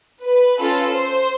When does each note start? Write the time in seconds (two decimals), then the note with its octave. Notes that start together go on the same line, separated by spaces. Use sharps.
0.23 B4
0.58 C#4 F4 A4
0.93 C5